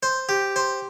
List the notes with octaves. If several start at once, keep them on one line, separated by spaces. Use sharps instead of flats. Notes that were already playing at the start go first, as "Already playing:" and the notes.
C5
G4
C5